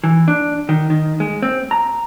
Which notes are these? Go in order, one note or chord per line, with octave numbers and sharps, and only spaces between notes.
E3
D4
D#3
D#3
G#3
C4
A#5